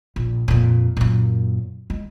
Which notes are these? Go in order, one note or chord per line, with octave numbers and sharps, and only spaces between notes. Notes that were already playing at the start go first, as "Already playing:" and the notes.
A#1
F2 A#2
F#2 A#2
G#3